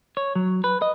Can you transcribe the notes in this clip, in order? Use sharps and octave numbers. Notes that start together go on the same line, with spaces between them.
C#5
F#3
B4
D#5